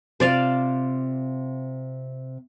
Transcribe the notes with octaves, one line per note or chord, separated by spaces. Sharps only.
C3 F4 C5 D5 F5